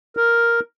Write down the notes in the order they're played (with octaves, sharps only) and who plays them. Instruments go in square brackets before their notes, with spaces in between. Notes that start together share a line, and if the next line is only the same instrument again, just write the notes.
[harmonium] A#4